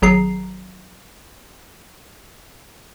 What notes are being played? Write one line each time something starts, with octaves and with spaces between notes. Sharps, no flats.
G#1 F#3 G#4 A#5 C7